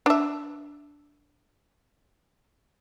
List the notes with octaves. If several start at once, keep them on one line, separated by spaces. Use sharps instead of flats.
D4 E5